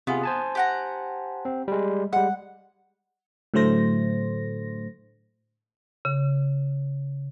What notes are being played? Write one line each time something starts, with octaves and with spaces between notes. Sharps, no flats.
C3 B3 F4 G#4
C5 G#5 A5
G4 F#5 A#5
C4
G3 G#3
G3 G#3 F#5
A2 D3 F#3 A3 C5 A#6
C#3